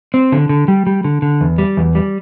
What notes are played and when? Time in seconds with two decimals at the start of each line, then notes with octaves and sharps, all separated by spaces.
0.14 C4
0.32 D3
0.49 D3
0.68 G3
0.87 G3
1.04 D3
1.22 D3
1.41 E2
1.58 G3
1.77 E2
1.95 G3